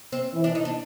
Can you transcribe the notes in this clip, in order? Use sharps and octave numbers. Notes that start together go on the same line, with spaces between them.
C4
E3
D4
D#4
D4